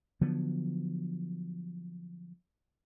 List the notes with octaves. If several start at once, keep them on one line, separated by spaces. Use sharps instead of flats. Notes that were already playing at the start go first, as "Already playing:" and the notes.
D3 F3 F#3 B3